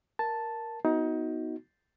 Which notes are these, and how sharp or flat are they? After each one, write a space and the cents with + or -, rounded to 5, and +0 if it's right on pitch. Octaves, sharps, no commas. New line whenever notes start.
A#4 +5 A5 +0
B3 +5 D#4 +25 F#4 +0